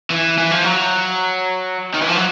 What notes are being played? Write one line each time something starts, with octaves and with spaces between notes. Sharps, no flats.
E3
E3
F3
F#3
D#3
E3
F3
F#3